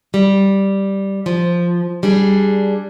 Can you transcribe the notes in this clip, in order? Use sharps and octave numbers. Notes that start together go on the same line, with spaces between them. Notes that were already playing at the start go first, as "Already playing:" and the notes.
G3
F3
G3 D4 G#4